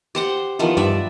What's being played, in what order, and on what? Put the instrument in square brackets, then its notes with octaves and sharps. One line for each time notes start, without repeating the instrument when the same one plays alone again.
[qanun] G4 C5 F#5
[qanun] D#3 F3 B3 [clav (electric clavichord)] E4 A#4
[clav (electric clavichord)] G2 [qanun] D5 E5